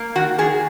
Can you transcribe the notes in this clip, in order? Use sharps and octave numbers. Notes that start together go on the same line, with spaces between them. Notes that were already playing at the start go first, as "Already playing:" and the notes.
Already playing: A#3
D#3 F#4
D#3 G#4